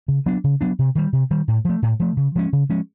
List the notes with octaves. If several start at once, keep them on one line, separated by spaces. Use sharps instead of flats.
C#3
F#3 B3 D4
C#3
F#3 B3 D4
C3
D#3 G3
C3
D#3 G3
A2
F3 A3
A2
F3 A3
C#3
F3 G#3 C#4
C#3
F3 G#3 C#4